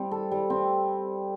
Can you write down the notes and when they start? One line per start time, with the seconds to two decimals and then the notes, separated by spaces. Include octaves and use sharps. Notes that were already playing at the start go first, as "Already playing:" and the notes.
Already playing: G3 C4
0.11 A4
0.31 G3
0.50 C4